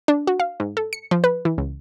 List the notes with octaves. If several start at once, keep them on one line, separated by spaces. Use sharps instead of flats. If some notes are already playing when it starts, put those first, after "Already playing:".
D4
F#4
F5
G#2
A4
C#7
F3
B4
E3
C#2